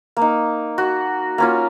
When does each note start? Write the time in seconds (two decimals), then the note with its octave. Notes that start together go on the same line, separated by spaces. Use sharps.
0.17 A#3 D#4
0.78 F#4
1.38 A#3 C#4 F4